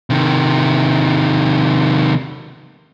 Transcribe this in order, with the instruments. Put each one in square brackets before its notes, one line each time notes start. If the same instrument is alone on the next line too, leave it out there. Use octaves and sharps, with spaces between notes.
[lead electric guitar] C3 D#3